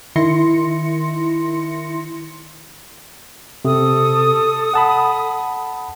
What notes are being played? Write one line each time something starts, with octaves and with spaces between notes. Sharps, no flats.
D#3 E4 C6 A#6 C#7
C3 A4 D#6
F#5 A5 B5